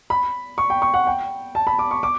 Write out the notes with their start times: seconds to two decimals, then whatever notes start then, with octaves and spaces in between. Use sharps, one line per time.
0.10 B5
0.58 C#6
0.70 G5
0.82 C#6
0.94 F#5
1.07 G5
1.55 A5
1.67 B5
1.79 D6
1.91 C#6
2.03 D6